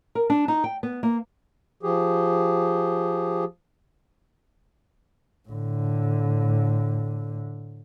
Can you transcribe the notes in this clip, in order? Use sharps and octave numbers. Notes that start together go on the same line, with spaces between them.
A#4
D4
D#4
G5
B3
A#3
F3 G4 G#4
A2 D3